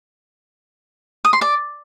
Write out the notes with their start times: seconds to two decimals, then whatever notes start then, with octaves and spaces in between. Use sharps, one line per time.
1.25 D#6
1.33 C6
1.41 D5